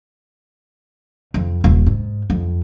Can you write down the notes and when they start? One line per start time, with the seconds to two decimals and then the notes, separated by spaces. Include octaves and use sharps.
1.34 F2
1.64 D#1
1.86 G#2
2.30 F2